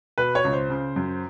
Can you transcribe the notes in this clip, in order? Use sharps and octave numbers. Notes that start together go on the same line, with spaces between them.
B2 B4
C#5
C#2
C5
C#3
F#2